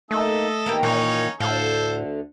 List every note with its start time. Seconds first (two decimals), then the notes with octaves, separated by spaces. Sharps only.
0.11 A3 A#3 D#4 A4 D#5 E5
0.66 D#3 A#3 B3 G4 A#5
0.83 A#2 E3 A#3 C#4 D#4 C#5
1.40 D2 A2 D3 A4 C5 F5